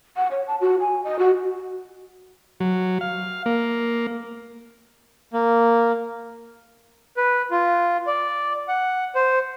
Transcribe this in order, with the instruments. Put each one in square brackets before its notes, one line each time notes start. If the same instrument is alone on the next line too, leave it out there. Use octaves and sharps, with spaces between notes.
[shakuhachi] F#5
C#5
A5
F#4
G#5
D#5
F#4
[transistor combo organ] F#3
F5
A#3
[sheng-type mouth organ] A#3
B4
F4
D5
F#5
C5